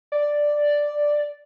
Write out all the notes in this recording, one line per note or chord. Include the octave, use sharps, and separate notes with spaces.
D5